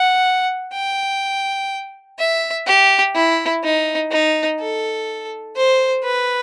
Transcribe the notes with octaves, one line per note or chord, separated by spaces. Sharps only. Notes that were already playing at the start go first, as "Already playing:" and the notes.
Already playing: F#5
G5
E5
G4
E4
D#4
D#4
A4
C5
B4